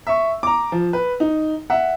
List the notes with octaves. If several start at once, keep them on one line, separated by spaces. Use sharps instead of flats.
E5 C#6
A#5 D6
F3
B4
D#4
E5 F#5